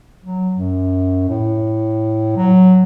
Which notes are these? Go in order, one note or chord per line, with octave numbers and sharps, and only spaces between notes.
F#3
F#2
A2
F#3